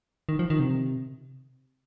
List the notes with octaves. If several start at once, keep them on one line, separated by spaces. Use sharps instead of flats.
D#3
F3
D#3
C3